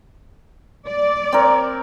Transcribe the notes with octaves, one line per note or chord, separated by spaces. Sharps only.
D5
C4 A#4